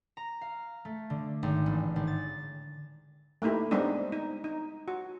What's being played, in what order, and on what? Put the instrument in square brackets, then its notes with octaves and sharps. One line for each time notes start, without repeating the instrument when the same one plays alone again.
[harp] A#5
F5
A3
D3
G#1
A1
G#1
A6
[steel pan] A3 A#3 D#4 E4 G4
G3 G#3 B3 C4 D4 D#4
D#4
D#4
F#4